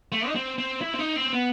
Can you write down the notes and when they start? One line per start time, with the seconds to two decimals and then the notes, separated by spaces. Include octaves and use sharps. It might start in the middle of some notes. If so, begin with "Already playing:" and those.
0.12 A3
0.28 D#4
0.35 C4
0.58 C4
0.81 E4
0.94 C4
0.99 D#4
1.16 C4
1.33 B3